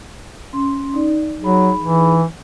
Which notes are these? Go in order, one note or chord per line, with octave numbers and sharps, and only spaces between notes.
C#4 C6
D#4 D5
F#3 D#4 G#4 B5
E3